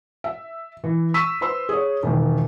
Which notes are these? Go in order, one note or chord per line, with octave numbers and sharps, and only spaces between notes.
E5
E3
C#6 E6 B6 D#7
B4 C5 C6 E6
G#4 C#5
E1 D#3